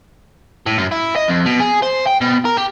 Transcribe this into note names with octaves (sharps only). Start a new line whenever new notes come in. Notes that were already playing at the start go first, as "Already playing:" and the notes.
A2
F#2
E4
D#5
F2
B2
G#4
C5
G5
B2
A#4
G4